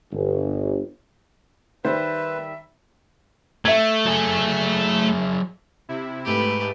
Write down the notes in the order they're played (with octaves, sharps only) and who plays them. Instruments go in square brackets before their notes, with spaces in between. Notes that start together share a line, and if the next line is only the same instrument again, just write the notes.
[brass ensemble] G1
[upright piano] D#3 G3 [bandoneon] B4 [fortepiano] C5 [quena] E5
[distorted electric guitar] A3 [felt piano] E5 G#6
[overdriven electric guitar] F#3 G#4
[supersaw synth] C3 E4
[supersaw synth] G#2 A3 B5 [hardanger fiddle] G4 B4